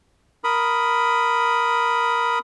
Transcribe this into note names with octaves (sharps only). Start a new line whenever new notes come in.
A#4 B5 D#6